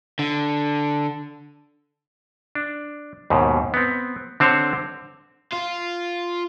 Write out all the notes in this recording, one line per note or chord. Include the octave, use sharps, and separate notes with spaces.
D3
D4
D#2 G#2 B2
B3 C4
D3 C4 C5 C#5
F4